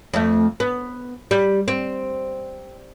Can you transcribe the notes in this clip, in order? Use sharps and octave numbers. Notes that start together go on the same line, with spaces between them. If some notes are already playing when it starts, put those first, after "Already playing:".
F2 A3
B3
G3
C4